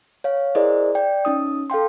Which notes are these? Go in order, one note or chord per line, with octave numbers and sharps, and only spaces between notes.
C#5 F5
E4 G#4 A#4 C5 D5 D#5
D5 G5
C#4 D#4 D#6
A4 F5 G5 C6